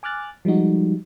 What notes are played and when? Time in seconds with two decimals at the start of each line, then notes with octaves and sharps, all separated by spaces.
0.03 G#5 D6 F6 F#6 A6
0.45 F3 G3 G#3 D#4 F#4